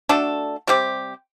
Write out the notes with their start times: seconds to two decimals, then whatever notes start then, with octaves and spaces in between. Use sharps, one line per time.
0.09 A3 D4 F#4 A4
0.67 C3 G3 C4 G4